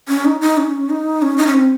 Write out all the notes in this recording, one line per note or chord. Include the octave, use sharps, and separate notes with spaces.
C#4
D#4
D#4
C#4
D#4
C#4
D#4
C#4
C4